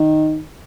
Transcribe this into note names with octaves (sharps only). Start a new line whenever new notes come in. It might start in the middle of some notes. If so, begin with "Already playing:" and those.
Already playing: D#3